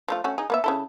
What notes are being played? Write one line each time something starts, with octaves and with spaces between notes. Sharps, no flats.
F3 A3 F4
A3 C#4 F#4
D#4 G#4
A#3 B3 E5
C#3 E4 A4